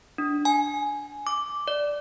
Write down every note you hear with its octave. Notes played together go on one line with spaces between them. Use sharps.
D4
G#5
D6
D5